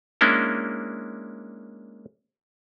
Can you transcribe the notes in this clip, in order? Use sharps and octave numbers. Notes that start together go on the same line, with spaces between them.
G#3 A#3 C#4 D4 E4